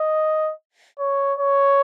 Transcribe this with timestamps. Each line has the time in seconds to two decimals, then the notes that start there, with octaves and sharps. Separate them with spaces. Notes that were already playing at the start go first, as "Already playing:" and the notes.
Already playing: D#5
0.99 C#5
1.39 C#5